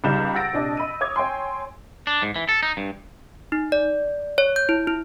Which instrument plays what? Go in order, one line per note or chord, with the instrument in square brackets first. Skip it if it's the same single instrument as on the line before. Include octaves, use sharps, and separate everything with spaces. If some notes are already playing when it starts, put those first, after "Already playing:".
[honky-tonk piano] C#2 G3 D#4 G6 E7
F#5 E6 A6 A#6 D7
A#1 C3 D4 D#5 A5
D#5 B5 E6 D#7
C#5 D6 D#6 G#6
C#5 G5 G#5 C6
[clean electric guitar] D4
G#2
E3
A4
D#4
G2
[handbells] D#4
D5
C#5
G6
E4
E4